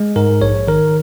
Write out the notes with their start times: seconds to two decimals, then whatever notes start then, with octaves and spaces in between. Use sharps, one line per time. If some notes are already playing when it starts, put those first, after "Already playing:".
Already playing: G#3
0.16 G#2 A#4
0.41 A#1 C#5
0.67 D#3 A#4